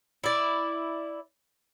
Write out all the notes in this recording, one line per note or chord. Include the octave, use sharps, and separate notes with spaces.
E4 D5